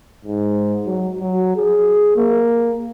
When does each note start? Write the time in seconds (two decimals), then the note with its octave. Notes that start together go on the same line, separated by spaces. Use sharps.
0.25 G#2
0.86 F#3
1.20 F#3
1.56 G#4
2.16 A#3